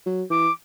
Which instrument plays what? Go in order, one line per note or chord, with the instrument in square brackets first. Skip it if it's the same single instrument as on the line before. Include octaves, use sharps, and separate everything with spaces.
[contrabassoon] F#3
[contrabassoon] E3 [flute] D6